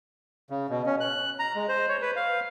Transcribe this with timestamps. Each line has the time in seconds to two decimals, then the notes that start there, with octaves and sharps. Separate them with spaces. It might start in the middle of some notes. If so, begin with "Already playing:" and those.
0.50 C#3
0.70 B2
0.86 C#4
1.00 F#6
1.39 A#5
1.55 G#3
1.68 C5
1.88 C#5
2.02 B4
2.16 F5